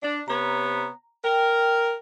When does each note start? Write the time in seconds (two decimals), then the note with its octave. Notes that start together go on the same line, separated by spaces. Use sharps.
0.03 D4
0.28 C3 B3 C#5 A#5
1.24 A#4 G5